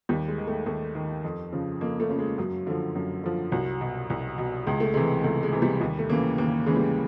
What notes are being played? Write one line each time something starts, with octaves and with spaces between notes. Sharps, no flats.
D#2 G3
G#3
D#3
A3
D#2 A3
D#3
F2
C#3 F3
F2 A#3
A3
C#3 F3
G#3
F#2 F#3
D3 F3
F#2
D3 F3
C2 F#3
B2
C2
B2
C#2 G#3
A3
C3 E3 G#3
C#2 A3
G#3
C3 E3
G3
D#2 G3
A3
C#3 E3 A#3
D#2 A#3
C#3 E3 G#3
G3